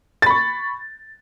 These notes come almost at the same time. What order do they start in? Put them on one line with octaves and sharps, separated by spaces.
A6 B5 C#6